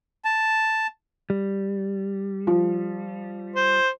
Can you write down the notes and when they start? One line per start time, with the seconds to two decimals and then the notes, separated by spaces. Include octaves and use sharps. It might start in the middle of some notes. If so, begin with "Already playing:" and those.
0.25 A5
1.30 G3
2.47 F3
3.56 C5